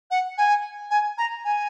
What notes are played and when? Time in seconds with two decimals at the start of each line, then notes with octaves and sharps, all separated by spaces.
0.10 F#5
0.38 G#5
0.90 G#5
1.18 A#5
1.44 G#5